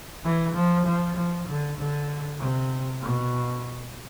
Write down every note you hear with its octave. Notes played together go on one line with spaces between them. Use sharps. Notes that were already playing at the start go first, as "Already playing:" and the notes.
E3
F3
F3
F3
D3
D3
C3
B2